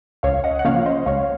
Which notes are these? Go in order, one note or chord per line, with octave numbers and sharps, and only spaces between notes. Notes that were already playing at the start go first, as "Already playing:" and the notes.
C#2 C#5 F5
D#5 F#5
F#5
C#3 F3 A#3 C#4 C#5 F5
C5 D#5
C#2 C#5 F5